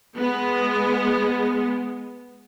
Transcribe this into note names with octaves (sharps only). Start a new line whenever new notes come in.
G#3 B3